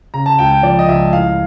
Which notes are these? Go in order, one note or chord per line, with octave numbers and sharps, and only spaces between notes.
C#3 A#5
A5
C#2 G5
G5
F3 D5
D#5
C#2 E5
A2 F5